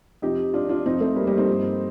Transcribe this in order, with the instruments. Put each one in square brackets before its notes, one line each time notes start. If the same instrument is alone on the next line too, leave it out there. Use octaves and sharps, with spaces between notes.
[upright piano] F2 C3 F3 D#4 G4
D4 F4
D4 F4
F2 C3 F3 C4 D#4
A3 C4
G3 A#3
G3 A#3
C4 D#4
G2 F3